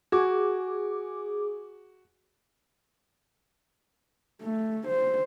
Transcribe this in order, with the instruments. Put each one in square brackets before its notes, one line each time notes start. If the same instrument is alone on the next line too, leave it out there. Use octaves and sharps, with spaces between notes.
[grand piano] F#4 [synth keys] G#4 D6
[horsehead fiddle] A3
C5